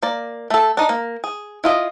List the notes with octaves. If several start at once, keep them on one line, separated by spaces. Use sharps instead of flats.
A#3 D5
A3 A4
D4 D#4
A#3
G#4
E4 F4 D#5